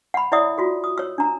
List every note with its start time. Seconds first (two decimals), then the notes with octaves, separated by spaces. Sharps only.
0.14 F#5 B5
0.32 E4 C#5 D5 E5 F#5 D#6
0.58 F4 F#4 A4
0.84 D#6
0.98 C#5 E6
1.18 D4 A#5